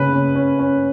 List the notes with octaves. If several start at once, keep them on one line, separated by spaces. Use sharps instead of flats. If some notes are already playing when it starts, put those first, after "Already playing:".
Already playing: C#3 C#4 B4
C#4
C#4
C#4